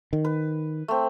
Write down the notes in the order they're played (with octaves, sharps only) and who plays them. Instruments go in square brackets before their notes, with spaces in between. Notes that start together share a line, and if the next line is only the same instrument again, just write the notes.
[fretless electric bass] D#3
[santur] B4
A3 C4